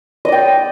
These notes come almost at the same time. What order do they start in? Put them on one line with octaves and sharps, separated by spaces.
D#5 D5 G5